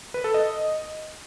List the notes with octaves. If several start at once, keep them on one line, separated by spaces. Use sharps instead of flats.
B4
A4
D#5